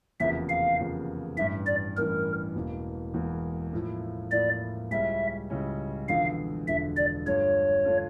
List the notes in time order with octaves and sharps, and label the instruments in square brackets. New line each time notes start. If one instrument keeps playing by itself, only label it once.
[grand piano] F1 E2 C#3 F3 A#3 [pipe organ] E5
[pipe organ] F5
[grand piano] F1 E2 C#3 F3 A#3
[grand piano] A1 G2 E3 [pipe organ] E5
[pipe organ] D5
[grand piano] A1 G2 E3 [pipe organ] A#4
[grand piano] E1 E2 E3 A#3
E1 E2 E3 A#3
A2 F3 A#3 E4
[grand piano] A2 F3 A#3 E4 [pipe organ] D5
[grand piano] C#2 C#3 G3 C#4 E4 [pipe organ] E5
[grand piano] C#2 C#3 G3 C#4 E4
[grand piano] E1 E2 D3 F3 [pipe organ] F5
[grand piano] E1 E2 D3 F3 [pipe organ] E5
[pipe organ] D5
[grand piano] G2 D3 A3 D4 F4 [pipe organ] C#5
[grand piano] D3 A3 D4 F4